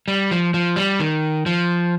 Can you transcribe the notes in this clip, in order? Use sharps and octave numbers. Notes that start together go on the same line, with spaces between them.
G3
F3
F3
G3
D#3
F3